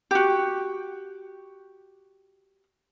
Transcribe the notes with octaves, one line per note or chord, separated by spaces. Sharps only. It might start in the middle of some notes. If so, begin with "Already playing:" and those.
F#4 G4